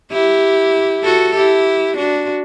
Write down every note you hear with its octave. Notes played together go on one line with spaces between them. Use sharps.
E4 G4
F#4 A4
E4 G4
D4 F#4